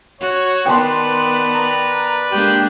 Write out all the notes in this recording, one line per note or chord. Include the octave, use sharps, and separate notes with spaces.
F#4 C#5
D#3 B3 B4 D5 G5 A5 C6
A#5
G#3 A#3 D4 G4 G5 F#6